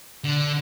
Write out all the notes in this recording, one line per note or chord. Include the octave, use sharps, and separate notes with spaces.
D3